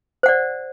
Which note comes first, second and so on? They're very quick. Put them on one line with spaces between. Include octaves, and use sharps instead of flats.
C5 F#5 D5